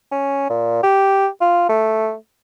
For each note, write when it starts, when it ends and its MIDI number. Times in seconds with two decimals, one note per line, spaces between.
0.12 0.47 61
0.50 0.81 46
0.83 1.28 67
1.41 1.68 65
1.69 2.14 57